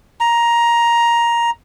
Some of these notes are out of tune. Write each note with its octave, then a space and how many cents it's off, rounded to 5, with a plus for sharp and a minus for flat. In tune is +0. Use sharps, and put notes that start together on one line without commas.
A#5 +10